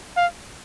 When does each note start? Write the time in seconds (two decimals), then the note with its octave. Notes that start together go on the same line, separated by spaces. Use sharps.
0.17 F5